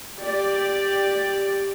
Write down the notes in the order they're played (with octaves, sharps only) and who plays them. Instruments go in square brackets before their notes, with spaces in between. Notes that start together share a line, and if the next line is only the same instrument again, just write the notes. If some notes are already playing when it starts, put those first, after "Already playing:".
[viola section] G4 D5